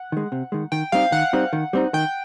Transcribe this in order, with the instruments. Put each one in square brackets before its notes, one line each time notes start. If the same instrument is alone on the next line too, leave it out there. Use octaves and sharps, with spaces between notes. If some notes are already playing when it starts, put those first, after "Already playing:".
Already playing: [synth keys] F#5
[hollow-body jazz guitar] D#3 G#3
C3
D#3 G#3
[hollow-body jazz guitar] D#3 [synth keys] G5
[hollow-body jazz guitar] G3 C4 D#4 [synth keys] F5
[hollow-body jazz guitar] D#3 [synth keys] F#5
[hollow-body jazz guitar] G3 C4 D#4
D#3
G3 C4 D#4
[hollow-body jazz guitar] D#3 [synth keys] G5